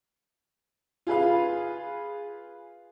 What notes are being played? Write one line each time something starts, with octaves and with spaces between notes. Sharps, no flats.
F4 G#4 B4 F5